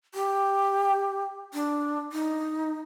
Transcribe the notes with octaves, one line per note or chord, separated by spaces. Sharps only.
G4
D4
D#4